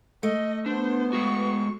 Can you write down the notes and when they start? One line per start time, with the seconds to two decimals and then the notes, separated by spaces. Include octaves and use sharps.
0.23 A3 D#5
0.66 B3 D4 C5
1.13 G#3 F#4 C#6